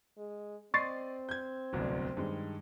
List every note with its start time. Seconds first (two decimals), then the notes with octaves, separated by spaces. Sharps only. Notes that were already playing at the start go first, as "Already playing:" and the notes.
0.18 G#3
0.74 C4 D5 D#5 C6 C#6 A6 C7
1.29 G6 G#6
1.73 D1 G1 C2
2.17 G2 D#3 G#3